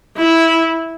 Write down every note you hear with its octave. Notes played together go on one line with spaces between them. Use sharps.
E4